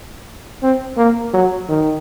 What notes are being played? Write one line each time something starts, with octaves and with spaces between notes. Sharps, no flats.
C4
A#3
F#3
D#3